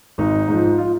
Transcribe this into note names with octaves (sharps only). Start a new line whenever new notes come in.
G#1 D#4
G#2 F3
F4